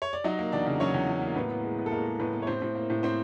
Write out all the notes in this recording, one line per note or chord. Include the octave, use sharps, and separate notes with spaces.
C#5
D5
F#3 D#4 D#5
A#3
E2 D4 D5
C#3
F#3 C#4 C#5
E2
F#3
A#3
A2 B3 B4
B3
G#3
B3
A4
G#3 A#3 A#4
G#3
A2 B3 B4
B3
C#5
A2 C4 C5
A2
A#3
A2
A2 C4 C5